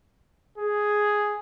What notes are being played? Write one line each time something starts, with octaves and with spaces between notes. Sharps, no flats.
G#4